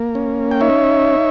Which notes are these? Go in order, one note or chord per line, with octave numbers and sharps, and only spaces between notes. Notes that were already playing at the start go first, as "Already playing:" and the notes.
Already playing: A#3
C#4
G5
D#4 C#5 E5